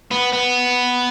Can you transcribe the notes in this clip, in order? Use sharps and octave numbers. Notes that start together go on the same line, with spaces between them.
B3
B3